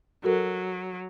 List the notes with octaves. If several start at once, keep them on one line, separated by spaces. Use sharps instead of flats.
F#3 F#4 A4 A#4